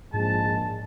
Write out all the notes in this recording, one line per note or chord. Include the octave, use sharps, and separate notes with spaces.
A#1 G#2 G#3 A5